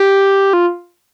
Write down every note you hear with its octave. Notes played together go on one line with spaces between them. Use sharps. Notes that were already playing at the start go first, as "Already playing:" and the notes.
Already playing: G4
F4